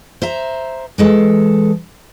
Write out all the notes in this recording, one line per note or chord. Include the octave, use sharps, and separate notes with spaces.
C5 E5 A#5
E3 G#3 A4